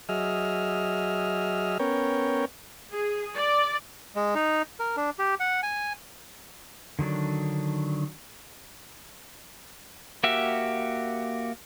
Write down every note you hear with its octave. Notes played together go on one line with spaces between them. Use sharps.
F#3 G#4 D#5 E5 F6
B3 C#4 A#4 C#5 G5
G#4
D5
G#3
D#4
A#4
D4
G4
F#5
G#5
D3 D#3 F#3 D4
A#3 F#4 G4 E5